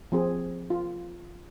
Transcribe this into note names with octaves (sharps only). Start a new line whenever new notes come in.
F3 C4 G#4
F4